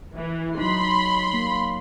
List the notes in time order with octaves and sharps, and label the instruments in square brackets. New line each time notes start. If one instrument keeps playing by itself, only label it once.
[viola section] E3
[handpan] F#3 D#4 [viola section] B5 C6
[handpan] A#3